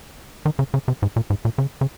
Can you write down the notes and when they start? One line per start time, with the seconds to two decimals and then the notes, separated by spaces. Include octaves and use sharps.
0.45 D#3
0.59 C#3
0.74 C#3
0.88 C3
1.02 G#2
1.16 A#2
1.30 G#2
1.45 A#2
1.58 C#3
1.81 C#3